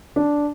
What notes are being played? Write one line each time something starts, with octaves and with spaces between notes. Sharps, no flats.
D4